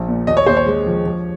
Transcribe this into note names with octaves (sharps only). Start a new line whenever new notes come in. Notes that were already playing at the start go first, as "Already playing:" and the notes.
Already playing: A#1
A#2
D#2 D#5
C#5
D#2 C5
C#5
G#3
F3
F3